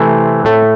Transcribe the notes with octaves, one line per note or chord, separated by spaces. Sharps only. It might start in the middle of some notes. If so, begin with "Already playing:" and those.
Already playing: C3 E3 A3 C4 C5
A2 A3